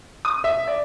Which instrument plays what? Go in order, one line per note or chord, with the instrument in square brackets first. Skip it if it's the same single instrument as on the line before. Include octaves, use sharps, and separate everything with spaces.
[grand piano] D#6
E5
D5